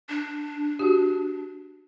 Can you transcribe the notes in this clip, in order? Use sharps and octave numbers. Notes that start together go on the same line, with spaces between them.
D4
F#4 G4